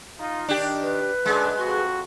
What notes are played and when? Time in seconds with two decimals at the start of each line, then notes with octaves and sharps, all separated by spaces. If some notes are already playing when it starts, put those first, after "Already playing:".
0.18 D#4 F4
0.49 D#3 D4 G4
0.82 B4
1.26 F#2 D3 G#3
1.59 F2 F#4